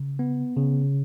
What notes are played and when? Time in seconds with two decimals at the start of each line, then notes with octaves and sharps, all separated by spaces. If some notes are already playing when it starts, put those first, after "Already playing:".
Already playing: C#3
0.19 B3
0.57 C#3